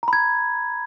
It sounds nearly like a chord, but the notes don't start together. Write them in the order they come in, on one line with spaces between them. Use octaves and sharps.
A#5 B5 G#6